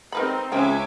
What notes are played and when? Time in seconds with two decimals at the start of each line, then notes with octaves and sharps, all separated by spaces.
0.12 C4 D#4 A#4 B4 B5
0.52 C#2 F3 C4 C#4 E5 G#5 D6